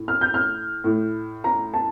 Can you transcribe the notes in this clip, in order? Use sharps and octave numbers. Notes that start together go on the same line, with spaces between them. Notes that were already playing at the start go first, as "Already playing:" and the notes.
Already playing: A2
F6
G6
F6
A2
A#5
A5